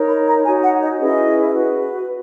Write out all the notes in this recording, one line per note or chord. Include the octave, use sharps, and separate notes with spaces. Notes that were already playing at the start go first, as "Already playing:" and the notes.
Already playing: D#4 A#4 C#5
B5
A#5
D#4 F#4 C#5 G#5
F#5
D#5
C#4 E4 G#4 B4 D#5
F#4 B4